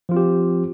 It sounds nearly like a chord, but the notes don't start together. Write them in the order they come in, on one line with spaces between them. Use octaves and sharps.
F3 F4 C4 G4